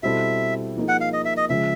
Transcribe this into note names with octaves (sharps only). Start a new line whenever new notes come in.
B2 G3 C4 E4 A4 E5
F3 A#3 D#4 G#4
F#5
F5
D#5
E5
D#5
C#3 F3 G#3 E5